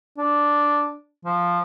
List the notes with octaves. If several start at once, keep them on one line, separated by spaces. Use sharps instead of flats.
D4
F3